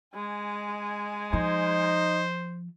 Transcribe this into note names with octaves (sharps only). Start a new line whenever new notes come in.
G#3 G#5
F3 D#4 C5